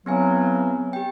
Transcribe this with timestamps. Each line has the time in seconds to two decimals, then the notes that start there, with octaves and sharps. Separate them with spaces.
0.06 C#3 E3 F#3 B3 C4 G#5
0.93 G4 G5